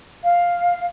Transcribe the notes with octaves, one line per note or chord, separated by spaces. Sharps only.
F5